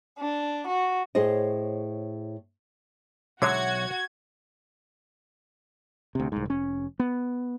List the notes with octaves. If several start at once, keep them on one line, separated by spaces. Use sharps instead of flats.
D4
F#4
A2 G#4 C5 C#5 D#5
B1 D3 F#3 G#3 F#4 C#5 E5 G#6
D2 C3
C2 G#2
F1 C#4
B3